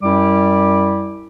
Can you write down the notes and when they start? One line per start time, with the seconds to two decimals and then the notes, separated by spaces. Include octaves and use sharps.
0.03 F#2 G3 E4 D6